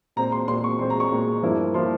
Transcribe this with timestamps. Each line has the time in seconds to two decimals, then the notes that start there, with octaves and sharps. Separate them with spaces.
0.16 A#2 G#3 C4 A#5
0.32 C6
0.48 A#2 G#3 C4 C6
0.64 C#6
0.79 A#2 G#3 C4 C6
0.90 A#5
1.00 C#6
1.11 A#2 G#3 C4
1.42 G2 F3 A#3 E4
1.74 F3 A#3 E4 C6